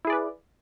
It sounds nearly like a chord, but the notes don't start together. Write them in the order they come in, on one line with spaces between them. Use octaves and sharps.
E4 G#4 D5 B4